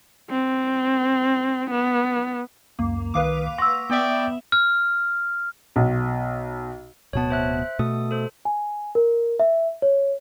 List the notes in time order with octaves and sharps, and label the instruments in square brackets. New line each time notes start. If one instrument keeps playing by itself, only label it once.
[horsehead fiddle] C4
B3
[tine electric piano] C#2 F#2 [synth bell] A#3
[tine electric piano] C2 D#3 D#6 [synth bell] B4 F5 D6
[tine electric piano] F#5 C#6 A#6 [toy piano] C6 E6
[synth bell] B3 E5 [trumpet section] D5 G5
[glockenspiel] F6
[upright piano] B1
[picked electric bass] D1 B2 B3 [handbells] C#5 A5
[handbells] C5 E5 F#6
[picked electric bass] B2 A3 [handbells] D#6
[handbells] A4 C5
[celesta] G#5
A#4
E5
C#5